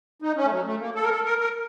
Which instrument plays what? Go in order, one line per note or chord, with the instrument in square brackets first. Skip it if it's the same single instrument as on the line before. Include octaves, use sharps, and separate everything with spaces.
[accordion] D#4
C#4
A3
F#3
A3
A#3
A4
A#4
A4
A#4
A#4